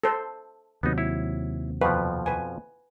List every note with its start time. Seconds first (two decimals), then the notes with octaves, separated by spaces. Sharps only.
0.04 A4 C5
0.83 D#2 C3 F#3 B3 D#4
0.98 E4 C#5
1.81 F2 B2 F3 B4
2.26 B4 G#5